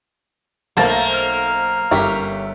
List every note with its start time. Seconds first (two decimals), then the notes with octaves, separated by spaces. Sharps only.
0.77 B1 A3 A#3 A4 C5 A5 A#6
1.13 F6
1.91 G1 C#4 G4 A#4 E5 B6